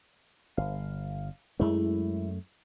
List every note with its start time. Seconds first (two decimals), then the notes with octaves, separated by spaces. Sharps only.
0.57 G1 F5
1.60 F#2 G#3 A3 E4